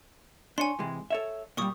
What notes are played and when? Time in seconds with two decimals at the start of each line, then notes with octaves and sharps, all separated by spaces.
0.58 D4 C#5 G#5 C6
0.79 C3 E3 G#3
1.10 A4 C#5 E5
1.57 A#2 F#3 G3 A#4 C#6 D#6